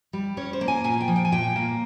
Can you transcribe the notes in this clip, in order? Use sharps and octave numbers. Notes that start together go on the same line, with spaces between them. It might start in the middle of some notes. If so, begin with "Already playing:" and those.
G3
C#4 C#5
C5
A#3
G#5
A#2 G#5
G5
F3
G5
G#5
A#2 G5
A#3